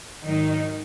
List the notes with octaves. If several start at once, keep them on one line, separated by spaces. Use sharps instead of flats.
G#2 D#3 F#3 D#4